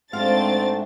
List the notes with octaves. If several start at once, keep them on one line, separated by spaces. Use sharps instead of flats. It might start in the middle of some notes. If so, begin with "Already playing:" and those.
G#2 G#3 A3 C4 D4 F4 F5 A6